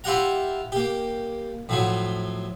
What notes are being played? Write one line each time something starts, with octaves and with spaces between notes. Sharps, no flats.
E4 F4 G4 F#5 A#5
A#3 G4
A2 F3 F#3